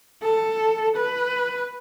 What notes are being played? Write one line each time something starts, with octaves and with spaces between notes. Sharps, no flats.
A4
B4